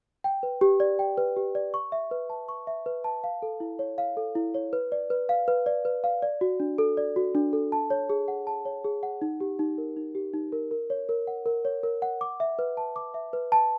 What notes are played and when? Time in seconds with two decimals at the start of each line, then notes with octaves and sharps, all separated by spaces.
0.24 G5
0.43 B4
0.61 G4
0.80 D5
0.99 G5
1.17 B4
1.36 G4
1.55 D5
1.74 C#6
1.92 E5
2.11 B4
2.30 A5
2.49 C#6
2.67 E5
2.86 B4
3.04 A5
3.24 F5
3.42 A4
3.60 E4
3.79 C#5
3.98 F5
4.17 A4
4.35 E4
4.54 C#5
4.73 B4
4.92 D5
5.10 B4
5.29 F5
5.48 B4
5.66 D5
5.85 B4
6.04 F5
6.23 D5
6.41 F#4
6.60 D4
6.78 A4
6.97 D5
7.16 F#4
7.35 D4
7.53 A4
7.72 A5
7.90 C#5
8.10 G#4
8.28 F#5
8.47 A5
8.65 C#5
8.84 G#4
9.03 F#5
9.22 D#4
9.40 G4
9.59 D#4
9.78 A#4
9.97 D#4
10.15 G4
10.34 D#4
10.52 A#4
10.71 A#4
10.90 C#5
11.09 A#4
11.27 F#5
11.46 A#4
11.65 C#5
11.83 A#4
12.02 F#5
12.21 D6
12.40 E5
12.59 B4
12.77 A5
12.96 D6
13.14 E5
13.33 B4
13.52 A5